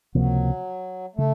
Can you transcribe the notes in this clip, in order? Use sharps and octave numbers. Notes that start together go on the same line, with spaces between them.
C#2 C3 F3 F#3 A#3
C#3 A3